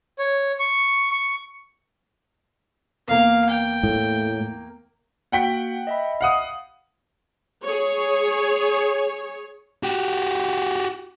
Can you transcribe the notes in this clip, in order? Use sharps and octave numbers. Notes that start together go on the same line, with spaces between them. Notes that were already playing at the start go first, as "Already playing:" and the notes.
C#5
C#6
C#6
E2 A#3 F5
G5
A2
A#3 F#4 F#5 G5 B6 D7
D#5 E5 B5
F5 F#5 D#6
G#4 C#5
F#4 G4